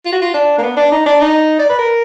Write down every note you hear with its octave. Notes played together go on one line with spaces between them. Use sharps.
F4
F#4
F4
D4
A#3
B3
D4
D#4
D4
D#4
D5
B4
A#4